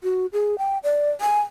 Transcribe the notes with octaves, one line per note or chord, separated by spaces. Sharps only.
F#4
G#4
G5
D5
G#5